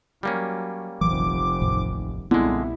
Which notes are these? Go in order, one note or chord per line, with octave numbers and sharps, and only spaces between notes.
F#3 G3 A#3 C#4
F1 A#1 F2 E3 F#3 D6
A1 D#2 A2
B1 A#2 D3 G3 G#3 B3 C4 E4